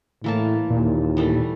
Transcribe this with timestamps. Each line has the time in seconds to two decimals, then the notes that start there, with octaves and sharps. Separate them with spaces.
0.24 A2 E3 A#3 A5
0.70 D#2 A#2
1.17 E3 G3 A3